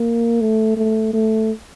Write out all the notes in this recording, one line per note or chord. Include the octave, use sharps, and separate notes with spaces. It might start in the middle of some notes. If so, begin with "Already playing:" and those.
Already playing: A#3
A3
A3
A3